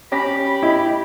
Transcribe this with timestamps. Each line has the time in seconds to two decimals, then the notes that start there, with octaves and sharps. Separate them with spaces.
0.12 C#4 G4 B5 A#6 B6
0.63 E4 D#5